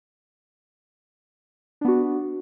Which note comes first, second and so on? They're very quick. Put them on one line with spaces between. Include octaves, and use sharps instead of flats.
D4 B3 F#4